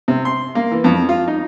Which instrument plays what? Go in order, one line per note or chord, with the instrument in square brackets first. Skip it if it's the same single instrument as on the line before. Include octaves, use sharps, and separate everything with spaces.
[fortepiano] C3
C6
A#3
E3
F2
F4
D#4